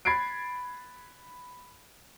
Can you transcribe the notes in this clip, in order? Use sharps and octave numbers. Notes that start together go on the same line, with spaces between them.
B5 G#6 A6 C7 D7